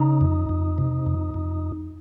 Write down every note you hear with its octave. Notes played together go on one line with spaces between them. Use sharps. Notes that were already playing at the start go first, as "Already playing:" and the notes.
Already playing: C#3 D#4
F2
F2
C3
F2
F2